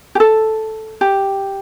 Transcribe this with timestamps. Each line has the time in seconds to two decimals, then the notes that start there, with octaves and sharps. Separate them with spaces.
0.15 G4
0.20 A4
1.01 G4